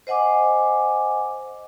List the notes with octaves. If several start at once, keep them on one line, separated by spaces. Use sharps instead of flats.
C5 D#5 F#5 G#5 D6